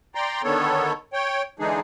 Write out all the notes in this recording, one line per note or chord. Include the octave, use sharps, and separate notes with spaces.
D5 G5 A#5 C6
D3 D#3 B3 A4 C#5
C#5 G5
D3 E3 G#3 D4 D#4 G#4